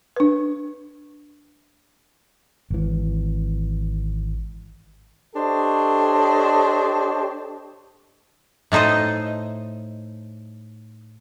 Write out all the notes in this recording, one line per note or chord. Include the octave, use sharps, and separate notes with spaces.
D4 B4
G#1 E3
D4 G4 A4 C5 C#5 D#5
A2 A3 D#4 C5 D#5